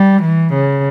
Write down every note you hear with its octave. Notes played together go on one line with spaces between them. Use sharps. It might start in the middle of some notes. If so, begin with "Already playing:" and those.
Already playing: G3
E3
C#3